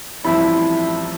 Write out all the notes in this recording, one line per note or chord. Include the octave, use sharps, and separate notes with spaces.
A1 G2 F3 C4 E4